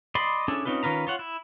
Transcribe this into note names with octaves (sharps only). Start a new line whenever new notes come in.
D5 D#5 B5 C6
C#4 D4 E4 G#4 A4
C4 C#4 D#4 F4 B4
D#3 C#4 F4 B4 A#5
F4 C#5 F#5
E4